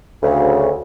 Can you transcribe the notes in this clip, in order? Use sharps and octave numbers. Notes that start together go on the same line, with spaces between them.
D2 C#3